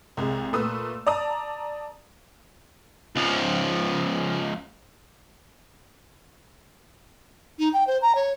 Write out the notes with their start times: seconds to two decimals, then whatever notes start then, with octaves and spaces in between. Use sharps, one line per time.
0.17 C2 G#3
0.53 A#2 A3 B4 D#6 E6
1.07 D5 A5 A#5 D#6
3.16 C#2 F3
7.59 D#4
7.73 G5
7.87 C5
8.02 A#5
8.15 C#5